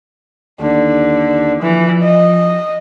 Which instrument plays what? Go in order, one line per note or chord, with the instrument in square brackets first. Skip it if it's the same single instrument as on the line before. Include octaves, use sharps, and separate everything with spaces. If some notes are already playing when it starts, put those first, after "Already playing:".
[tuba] D#2 [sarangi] D3
[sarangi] E3 [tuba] F3
[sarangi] D#5